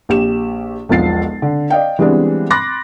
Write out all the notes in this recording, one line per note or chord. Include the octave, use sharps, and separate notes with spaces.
A#1 G4 E7
E1 B1 F3 A6 C7
D3
D5 D#5 F5 G5
E3 G3 G#3 B3 C4 D4
B5 C6 D6 F#6 A6 A#6